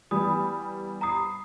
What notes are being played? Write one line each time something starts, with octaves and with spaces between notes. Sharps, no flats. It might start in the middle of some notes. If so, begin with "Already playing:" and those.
E3 G3 B3 B5 D#6
A#5 B5 D#6 C7